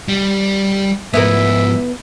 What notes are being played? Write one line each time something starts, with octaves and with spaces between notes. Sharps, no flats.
G3
G#2 F3 B3 E4 A#4 E5